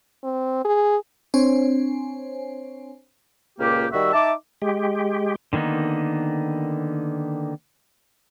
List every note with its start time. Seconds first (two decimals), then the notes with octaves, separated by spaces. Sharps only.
0.23 C4
0.65 G#4
1.34 C4 D4 C5 C#5 G#5
3.59 C#2 A#2 A#3 G4
3.92 D#3 G3 F#4 E5
4.13 D#4 E5 A5 D6
4.62 G#3 G4
5.53 D3 D#3 A#3 B3 D#4